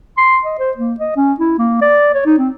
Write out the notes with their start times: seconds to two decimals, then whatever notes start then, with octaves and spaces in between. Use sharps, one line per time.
0.18 C6
0.45 D#5
0.59 C5
0.77 A#3
1.00 D#5
1.16 C#4
1.40 E4
1.59 A#3
1.82 D5
2.14 C#5
2.26 D#4
2.38 C4